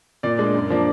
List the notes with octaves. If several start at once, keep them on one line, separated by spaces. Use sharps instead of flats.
A#2 D5
G#3 D4
F#2
F3 A#3 D4